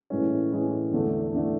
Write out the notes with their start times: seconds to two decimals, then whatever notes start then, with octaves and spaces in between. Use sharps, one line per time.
0.10 A2 E3 G#3 C#4
0.51 A2 E3 G#3 C#4
0.93 E2 D3 A3 D4
1.33 E2 D3 A3 D4